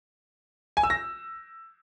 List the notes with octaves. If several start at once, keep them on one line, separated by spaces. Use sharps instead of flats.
G#5
E6
A#6